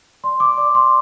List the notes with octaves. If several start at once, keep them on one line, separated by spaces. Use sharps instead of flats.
D5 C6
D6
D5 D6
C6